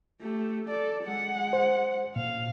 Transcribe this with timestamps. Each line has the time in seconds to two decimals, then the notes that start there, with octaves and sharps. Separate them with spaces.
0.21 A3 G4
0.66 A4 D5
1.04 G#3 F#5
1.53 C5
2.16 A#2 F5